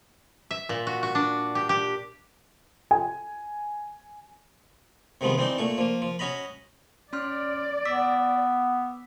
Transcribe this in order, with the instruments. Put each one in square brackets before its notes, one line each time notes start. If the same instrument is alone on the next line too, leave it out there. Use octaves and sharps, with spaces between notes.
[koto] E5
A#2
F#4
F#4
D4
G4
G4
[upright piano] G#5
[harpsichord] C3 D#3 F3 G#3 B3
E3 C4 D4 D#4
A#2 A3 C#6
F3 A#3
F3
C#4 F#4 D#5 A#5 B5
[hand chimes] C#4 C6 F6 [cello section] D5
[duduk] B3 [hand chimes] D6 E6 B6